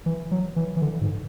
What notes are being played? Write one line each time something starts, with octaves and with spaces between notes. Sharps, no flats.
E3
F#3
E3
E3
D3
G#2